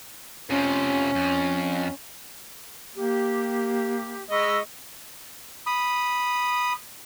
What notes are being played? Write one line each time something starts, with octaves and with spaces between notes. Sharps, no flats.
F2 C3 C#4
F2
A#3 G4
G#3 D#5 B5 C#6 E6
B5 D#6